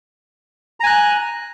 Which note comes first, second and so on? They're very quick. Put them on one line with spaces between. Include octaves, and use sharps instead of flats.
A#5 G#5 F#6